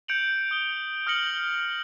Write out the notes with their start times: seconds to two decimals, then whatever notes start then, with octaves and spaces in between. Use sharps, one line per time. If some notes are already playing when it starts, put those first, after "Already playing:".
0.08 G6 C#7 D7 F7 F#7
0.51 D#6 G7
1.07 D#6 F6 G6 A#6 C#7 F#7